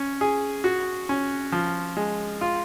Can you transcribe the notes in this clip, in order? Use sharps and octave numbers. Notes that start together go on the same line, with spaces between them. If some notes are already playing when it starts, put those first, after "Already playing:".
Already playing: C#4
G#4
F#4
C#4
F3
G#3
F4